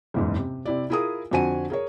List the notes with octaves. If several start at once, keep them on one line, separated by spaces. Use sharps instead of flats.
F#1 E2 G#2
C3
C3 E4 D5
E4 F4 G#4 A#4 D#6
F2 D3 F#4 C5 G#5 D#7
G#4 A#4 C#5